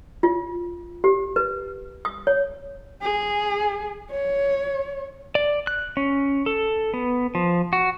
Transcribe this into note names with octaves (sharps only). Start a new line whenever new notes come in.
F4
G4
B4
D#6
C#5
G#4
C#5
D5
F#6
C#4
A4
B3
F3
F#4